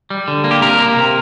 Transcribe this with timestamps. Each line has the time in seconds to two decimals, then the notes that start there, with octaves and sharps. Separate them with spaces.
0.10 G3
0.28 D3
0.44 A#3
0.51 G4
0.62 C3 A#4
0.79 A#3
0.96 C3